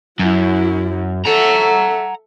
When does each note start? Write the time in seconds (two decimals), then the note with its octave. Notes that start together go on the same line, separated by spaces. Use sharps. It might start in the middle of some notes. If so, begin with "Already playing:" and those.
0.19 F#2 F#3 E4
1.26 A4 E5 F#5 A#5